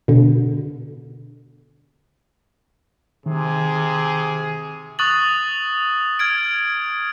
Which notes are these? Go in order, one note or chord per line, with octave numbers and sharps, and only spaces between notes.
B2 D3
C3 D#3 G#4
C#6 D#6 F#6 A6 F#7
F6 G#6 D7